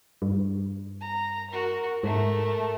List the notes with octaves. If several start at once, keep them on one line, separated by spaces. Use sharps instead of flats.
G2
A#5
F#4 A#4
G#2 A3 A#4